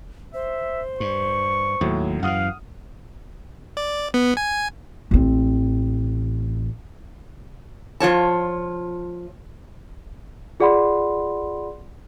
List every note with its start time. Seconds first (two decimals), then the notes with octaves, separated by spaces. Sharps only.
0.34 C5 E5
1.00 G2 C#6
1.81 D#2 A2 F#3
2.23 F#2 D#3 E3 F5 F#5 D#6 F6
3.77 D5
4.14 B3
4.37 G#5
5.11 A1 C4
8.00 F3 F4 C#5 A5
10.60 F4 G#4 D5 F#5 B5 C6